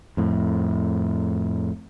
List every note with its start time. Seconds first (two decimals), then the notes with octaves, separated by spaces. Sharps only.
0.17 F2 A2